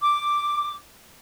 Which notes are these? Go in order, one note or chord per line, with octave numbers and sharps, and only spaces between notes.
D6